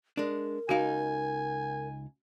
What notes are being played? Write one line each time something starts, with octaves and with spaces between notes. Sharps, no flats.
G#3 D4 A#4
C#2 D#4 F#4 F5 G#5